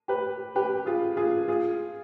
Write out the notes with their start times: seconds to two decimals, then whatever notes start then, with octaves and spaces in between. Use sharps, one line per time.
0.08 G4 B4
0.56 G4 B4
0.86 F4 G#4
1.17 F4 G#4
1.48 F4 G#4